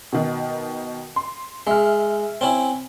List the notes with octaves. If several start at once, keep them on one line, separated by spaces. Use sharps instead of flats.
B2 D#3
C6
G#3 E5 F6
C4 C#4 E4